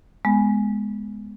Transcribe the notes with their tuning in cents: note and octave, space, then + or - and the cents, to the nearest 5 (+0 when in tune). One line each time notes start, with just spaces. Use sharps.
G#3 +5 B3 +0